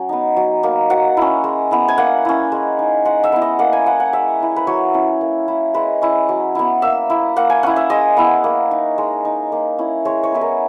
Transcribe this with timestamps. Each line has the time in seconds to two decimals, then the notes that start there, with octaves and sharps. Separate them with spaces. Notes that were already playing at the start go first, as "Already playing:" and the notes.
Already playing: F#3 C#4
0.09 B3 D#4
0.37 F#3
0.63 A#3 D#4
0.90 F#3 F#5
1.17 C#4 E4
1.44 G#3
1.71 B3 E4
1.88 G#5
1.98 A#3 F#5
2.25 C#4 E4
2.52 G#3
2.79 D#4
3.05 G#3 F#5
3.24 E5
3.32 B3 E4
3.42 D#5
3.59 A#3 F#5
3.73 G#5
3.86 E4 F#5
4.00 F#5
4.13 G#3 E5
4.40 C#4 E4
4.56 B4
4.67 F#3 C#5
4.94 C#4 E4
5.21 A#3
5.48 E4
5.74 G#3 B4
6.02 C#4 E4
6.29 F#3
6.55 B3 E4
6.82 A#3 E5
7.10 E4
7.36 A#3 F#5
7.50 G#5
7.63 C#4 E4 F#5
7.76 E5
7.90 G#3 D#5
8.17 B3 E4
8.44 A#3
8.71 D#4
8.98 G#3
9.25 D#4
9.52 A#3
9.79 C#4 E4
10.05 G#3 C#5
10.24 C#5
10.32 B3 E4 B4
10.41 A#4